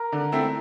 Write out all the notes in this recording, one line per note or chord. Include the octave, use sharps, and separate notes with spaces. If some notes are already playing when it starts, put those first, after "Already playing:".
Already playing: A#4
D3
A3 C4 E4